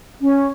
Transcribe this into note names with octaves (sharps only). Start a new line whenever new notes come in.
C#4